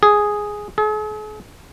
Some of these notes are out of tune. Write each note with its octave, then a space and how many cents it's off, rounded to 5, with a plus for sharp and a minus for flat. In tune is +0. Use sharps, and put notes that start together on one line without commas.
G#4 +0
G#4 +45